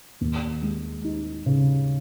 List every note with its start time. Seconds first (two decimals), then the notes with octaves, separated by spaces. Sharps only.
0.21 D#2
0.62 G#3
1.04 D#4
1.46 C#3